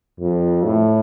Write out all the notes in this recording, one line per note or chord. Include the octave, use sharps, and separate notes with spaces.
F2
A2